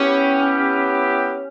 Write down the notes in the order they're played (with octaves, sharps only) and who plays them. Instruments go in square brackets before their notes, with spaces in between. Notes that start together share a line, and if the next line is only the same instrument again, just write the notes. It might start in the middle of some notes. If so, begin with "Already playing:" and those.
Already playing: [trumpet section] B3 E4 G4 [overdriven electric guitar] C#4